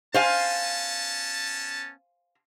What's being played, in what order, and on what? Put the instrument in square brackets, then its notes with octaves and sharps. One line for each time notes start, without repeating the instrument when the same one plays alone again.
[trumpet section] B3 C#4 A5 [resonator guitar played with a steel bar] C5 F5 G#5